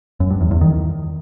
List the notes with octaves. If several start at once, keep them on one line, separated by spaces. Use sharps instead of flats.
F#2
G2
E2
E2
D#3